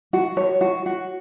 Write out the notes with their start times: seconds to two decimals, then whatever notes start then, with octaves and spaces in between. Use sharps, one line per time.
0.13 F#4
0.37 C#5
0.61 F#4
0.86 F#4